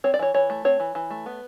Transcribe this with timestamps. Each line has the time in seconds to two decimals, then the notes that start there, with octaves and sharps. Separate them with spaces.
0.04 C4 C#5
0.14 D5
0.19 E3 C#5
0.34 E3 C#5
0.50 A3
0.65 C4 C#5
0.80 E3
0.95 E3
1.10 A3
1.26 B3